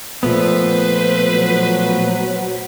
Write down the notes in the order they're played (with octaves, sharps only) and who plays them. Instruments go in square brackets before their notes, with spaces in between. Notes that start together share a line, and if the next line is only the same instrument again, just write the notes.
[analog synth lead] A#2 [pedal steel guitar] F3 A3 B3 [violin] B4 C5
[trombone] F#3